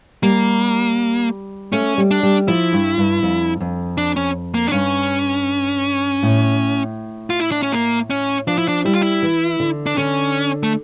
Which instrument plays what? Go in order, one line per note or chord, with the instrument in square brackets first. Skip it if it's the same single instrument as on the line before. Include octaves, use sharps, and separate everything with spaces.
[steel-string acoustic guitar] G3 [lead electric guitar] A#3
[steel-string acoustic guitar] A3 [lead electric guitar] C#4
[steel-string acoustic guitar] G3
[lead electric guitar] D4
[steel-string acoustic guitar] G3
[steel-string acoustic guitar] F3 [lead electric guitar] E4
[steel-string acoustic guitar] G2
G2
F2
F2
[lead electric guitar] D4
C#4
A#3
D4
[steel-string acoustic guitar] G2 [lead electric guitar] C#4
[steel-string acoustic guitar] A2
[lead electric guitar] F4
E4
D4
C#4
A#3
C#4
[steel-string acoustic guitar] F3 [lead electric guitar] D4
[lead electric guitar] E4
D4
[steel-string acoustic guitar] G3 [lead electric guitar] E4
[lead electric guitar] F4
E4
[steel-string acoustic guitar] E3
D3
[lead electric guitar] D4
[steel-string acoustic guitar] D3 [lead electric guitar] C#4
[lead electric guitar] A3